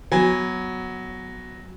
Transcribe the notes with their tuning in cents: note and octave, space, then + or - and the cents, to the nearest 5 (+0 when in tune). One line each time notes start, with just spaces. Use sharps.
F#3 +0 B3 +0 G#5 -20